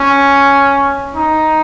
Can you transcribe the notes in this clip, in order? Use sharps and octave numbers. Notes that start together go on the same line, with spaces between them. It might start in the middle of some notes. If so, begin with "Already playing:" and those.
Already playing: C#4
D#4